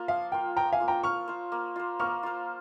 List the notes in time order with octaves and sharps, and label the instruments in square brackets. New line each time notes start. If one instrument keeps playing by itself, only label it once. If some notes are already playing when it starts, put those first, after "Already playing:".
Already playing: [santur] A#3 F4
[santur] F3 [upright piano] F5
[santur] A#3 F4 [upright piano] G5
[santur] F3 [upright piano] G5 A#5
[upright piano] F5 G#5
[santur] A#3 F4
[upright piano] G5 A#5
[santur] A#3 [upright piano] C#6 F6
[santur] F4 C5
A#3
F4 C5
[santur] A#3 [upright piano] C#6 F6
[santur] F4 C5